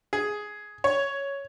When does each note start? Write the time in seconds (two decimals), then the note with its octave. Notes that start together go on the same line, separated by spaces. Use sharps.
0.13 G#4
0.84 C#5